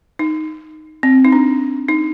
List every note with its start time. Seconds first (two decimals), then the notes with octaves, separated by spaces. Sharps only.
0.19 D#4
1.03 C4
1.25 D#4
1.32 D4
1.89 D#4